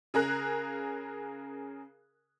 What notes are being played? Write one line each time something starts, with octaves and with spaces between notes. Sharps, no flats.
C#3 G#4 A#4 F#6